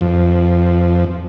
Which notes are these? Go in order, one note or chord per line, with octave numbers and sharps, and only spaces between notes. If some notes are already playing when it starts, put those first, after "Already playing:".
F2